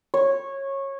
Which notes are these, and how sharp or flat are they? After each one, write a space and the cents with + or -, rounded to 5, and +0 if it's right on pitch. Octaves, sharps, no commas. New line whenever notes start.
C#5 -15